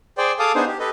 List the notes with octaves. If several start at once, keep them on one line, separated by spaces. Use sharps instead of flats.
G#4 C5 D5 G5
G#4 A4 F5 A5 D6 D#6
B3 D4 D#4 G#4 C5
G4
G4 A4 B4 D#5